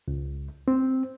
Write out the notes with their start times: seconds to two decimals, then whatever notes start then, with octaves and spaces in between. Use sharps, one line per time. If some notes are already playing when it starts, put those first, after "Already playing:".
0.08 C#2
0.68 C4